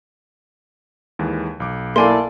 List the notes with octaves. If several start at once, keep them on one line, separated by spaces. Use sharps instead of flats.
D#2 E3 G#3
B1 D6
A#3 E4 A4 D5 F5 G#5 C6